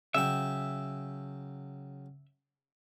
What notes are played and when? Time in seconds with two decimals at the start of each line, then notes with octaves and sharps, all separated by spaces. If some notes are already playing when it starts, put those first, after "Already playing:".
0.14 C#3 F#3 E5 G5